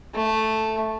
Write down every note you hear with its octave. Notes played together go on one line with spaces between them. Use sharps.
A3